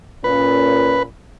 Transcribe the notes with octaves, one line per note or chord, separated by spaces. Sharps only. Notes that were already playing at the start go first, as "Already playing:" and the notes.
A#2 C#4 B4